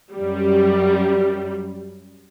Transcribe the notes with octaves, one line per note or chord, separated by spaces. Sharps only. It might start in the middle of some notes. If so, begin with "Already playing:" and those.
F#2 G3